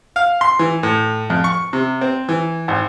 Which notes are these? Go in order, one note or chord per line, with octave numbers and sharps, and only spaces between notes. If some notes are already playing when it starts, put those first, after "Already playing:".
F5
C6
E3
A2
F2
C#6
C3
C4
E3
G#1